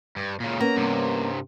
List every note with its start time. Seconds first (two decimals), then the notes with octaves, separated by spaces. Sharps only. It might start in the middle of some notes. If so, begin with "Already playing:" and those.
0.17 G2
0.40 A#2 C#3
0.61 A#3 B3 C#4 A#5
0.76 G2 C3